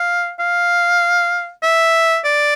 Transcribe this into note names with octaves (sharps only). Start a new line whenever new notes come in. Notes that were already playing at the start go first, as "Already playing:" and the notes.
Already playing: F5
F5
E5
D5